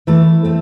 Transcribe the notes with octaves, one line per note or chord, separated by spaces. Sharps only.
E3 A3 A4
A3 C4